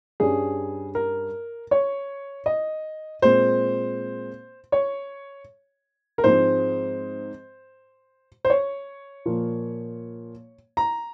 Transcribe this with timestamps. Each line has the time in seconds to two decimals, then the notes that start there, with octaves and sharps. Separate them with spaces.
0.20 G2 G3 C#4 G#4
0.95 A#4
1.71 C#5
2.46 D#5
3.22 A#2 G#3 C4 C5
4.72 C#5
6.18 A#4
6.24 G#2 F3 G#3 C4 C5
8.45 C5
8.50 C#5
9.26 A#2 F3 A#3
10.77 A#5